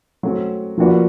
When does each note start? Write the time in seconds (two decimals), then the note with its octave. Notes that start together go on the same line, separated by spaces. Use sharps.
0.23 F#3 A3 C4
0.77 F3 A#3 D4 F#4 B4